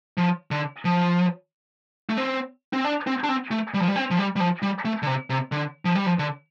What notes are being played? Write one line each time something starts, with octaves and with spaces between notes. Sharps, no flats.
F3
D3
F3
A3
C4
C4
D4
C4
D4
C4
A3
G3
F3
G3
C4
F3
G3
G3
F3
G3
A3
D3
C3
C3
D3
F3
G3
F3
D3